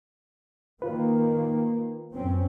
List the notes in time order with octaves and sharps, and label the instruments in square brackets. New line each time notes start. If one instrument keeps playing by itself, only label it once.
[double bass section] D#3 A#3 [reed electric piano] F4 B4
[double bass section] F#2 C4 C#4